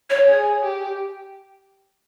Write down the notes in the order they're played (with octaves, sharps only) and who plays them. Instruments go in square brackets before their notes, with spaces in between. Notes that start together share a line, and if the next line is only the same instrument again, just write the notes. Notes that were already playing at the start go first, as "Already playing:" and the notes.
[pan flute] C#5
[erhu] G#4
G4